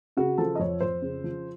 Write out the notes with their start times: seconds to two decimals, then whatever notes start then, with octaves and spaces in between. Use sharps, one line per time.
0.17 C#3 F#4
0.38 F3 A4
0.55 D#5
0.59 F2 C#5
0.81 F2 C5
1.02 C#3
1.24 F3